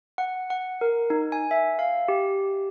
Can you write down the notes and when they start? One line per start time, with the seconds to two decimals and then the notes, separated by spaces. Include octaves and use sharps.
0.18 F#5
0.50 F#5
0.81 A#4
1.10 D#4
1.32 G#5
1.51 E5
1.79 F5
2.08 G4